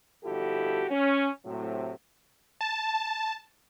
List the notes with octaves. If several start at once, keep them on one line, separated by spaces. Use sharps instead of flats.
G1 F2 E4 F#4 G4 A4
C#4
A2 C3 F#3
A5